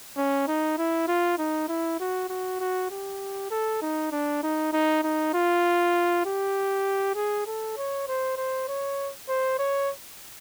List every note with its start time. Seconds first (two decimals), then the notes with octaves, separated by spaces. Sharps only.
0.17 C#4
0.48 D#4
0.78 E4
1.08 F4
1.38 D#4
1.69 E4
2.00 F#4
2.29 F#4
2.60 F#4
2.91 G4
3.51 A4
3.82 D#4
4.12 D4
4.43 D#4
4.73 D#4
5.03 D#4
5.34 F4
6.26 G4
7.16 G#4
7.47 A4
7.77 C#5
8.08 C5
8.37 C5
8.68 C#5
9.29 C5
9.59 C#5